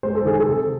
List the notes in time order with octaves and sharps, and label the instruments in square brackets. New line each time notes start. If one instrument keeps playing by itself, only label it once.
[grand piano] G#3 C5
A4
D#3 G#4
A4
C3